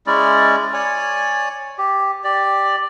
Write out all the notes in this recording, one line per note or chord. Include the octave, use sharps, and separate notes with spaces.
G#3 C#4 E4 D5
C#5 D5 G#5
G4
G4 D5